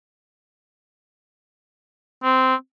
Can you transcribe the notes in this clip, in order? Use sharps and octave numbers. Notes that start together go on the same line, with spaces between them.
C4